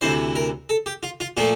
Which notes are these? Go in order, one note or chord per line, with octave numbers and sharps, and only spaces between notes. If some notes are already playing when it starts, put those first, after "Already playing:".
D2 C3 E3 C5
A#4
A4
G4
F4
F4
A#2 F3 A3 F4